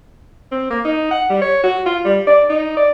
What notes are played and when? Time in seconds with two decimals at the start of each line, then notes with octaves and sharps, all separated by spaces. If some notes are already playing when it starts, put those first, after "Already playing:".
0.52 C4
0.70 A#3
0.85 D#4
1.11 F#5
1.30 G3
1.42 C#5
1.63 F#4
1.86 F4
2.05 G3
2.27 D5
2.49 D#4
2.77 D5